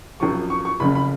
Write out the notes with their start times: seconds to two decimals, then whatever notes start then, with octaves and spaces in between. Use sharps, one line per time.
0.20 G#1 F#2 F3 C#6
0.50 C#6
0.65 C#6
0.80 F#1 F2 C#3 B5
0.95 B5